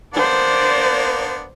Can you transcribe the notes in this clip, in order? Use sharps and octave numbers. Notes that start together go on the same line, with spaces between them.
A#3 B3 D4 C5 D5